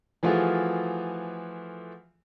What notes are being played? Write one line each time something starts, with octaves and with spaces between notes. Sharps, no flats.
E3 F3 A3 F4 F#4 G#4